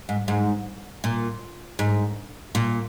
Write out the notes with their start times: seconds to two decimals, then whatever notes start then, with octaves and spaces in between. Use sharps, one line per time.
0.09 G#2
0.28 G#2
1.04 A#2
1.79 G#2
2.55 A#2